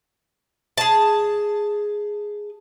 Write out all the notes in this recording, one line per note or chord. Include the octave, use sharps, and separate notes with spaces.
G#4 A5